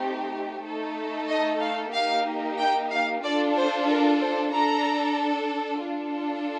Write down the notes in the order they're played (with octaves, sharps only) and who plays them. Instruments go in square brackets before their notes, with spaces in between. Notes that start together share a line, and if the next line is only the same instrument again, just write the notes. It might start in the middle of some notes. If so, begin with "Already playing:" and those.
Already playing: [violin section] A3 C4 D#4 G4
A3 D#4 A4
D#5
F5
A#3 D#4 G4 F5
G5
F5
D4 F4 A4 D5
C5
A#4
C5
D4 A4 A#5
D4 F4 A4